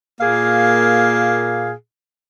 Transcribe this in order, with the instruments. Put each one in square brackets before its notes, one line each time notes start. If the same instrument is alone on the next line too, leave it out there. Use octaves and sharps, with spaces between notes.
[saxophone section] A#2 A#3 G#4 F5